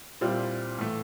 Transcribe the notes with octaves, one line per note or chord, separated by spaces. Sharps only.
A#2 G3 C4 E4
A2 E3 A3